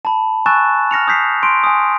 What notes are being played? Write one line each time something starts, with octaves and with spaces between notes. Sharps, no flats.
A5 B5
G#5 C#6 E6 F#6 A6 E7
F6 A#6 C#7 F7
D#6 G6 B6 C7
C6 D7
G#5 D#6